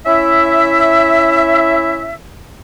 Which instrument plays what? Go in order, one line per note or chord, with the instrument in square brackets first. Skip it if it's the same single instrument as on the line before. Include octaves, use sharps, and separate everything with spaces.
[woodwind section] C#4 E4 E5